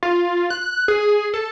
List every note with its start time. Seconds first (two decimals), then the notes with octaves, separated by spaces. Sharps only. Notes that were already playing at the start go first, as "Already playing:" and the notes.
0.03 F4
0.50 F#6
0.88 G#4
1.34 A4